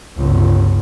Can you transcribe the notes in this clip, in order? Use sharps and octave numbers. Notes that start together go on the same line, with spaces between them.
G1 C#2